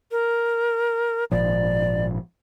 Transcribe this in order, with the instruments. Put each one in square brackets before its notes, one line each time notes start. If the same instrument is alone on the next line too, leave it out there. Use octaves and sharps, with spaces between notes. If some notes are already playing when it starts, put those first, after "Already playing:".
[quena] A#4
[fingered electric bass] G#1 A#2 F3 [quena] D5